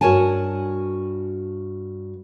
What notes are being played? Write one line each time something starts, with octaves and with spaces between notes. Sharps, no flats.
G2 F#4 A#4 C#5 G#5 A5